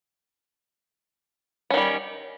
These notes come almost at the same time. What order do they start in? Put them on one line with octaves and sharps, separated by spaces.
C#4 D#3 G3